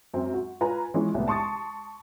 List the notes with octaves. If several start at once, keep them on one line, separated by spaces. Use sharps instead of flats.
F#2 C4
F#4
F4 B4 G#5 A#5
E3 F3 G#3 B3 C#4 E4
C2 A2 B3
A5 C6 C#6 D#6 A6